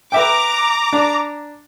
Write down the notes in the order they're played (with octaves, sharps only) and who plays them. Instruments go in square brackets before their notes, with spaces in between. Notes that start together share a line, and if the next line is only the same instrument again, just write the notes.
[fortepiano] B4 E5 G5 [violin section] A#5 D6
[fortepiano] D4